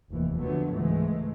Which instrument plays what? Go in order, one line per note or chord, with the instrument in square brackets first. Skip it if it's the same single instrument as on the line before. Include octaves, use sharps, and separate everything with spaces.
[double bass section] F1 D#2 E3
F2 D3 F#3 A3 B3
C#2 G#2 E3 G#3 A3